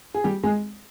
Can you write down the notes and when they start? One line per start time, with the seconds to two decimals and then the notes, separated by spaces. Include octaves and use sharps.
0.14 G#4
0.24 G3 G4
0.43 G#3 G#4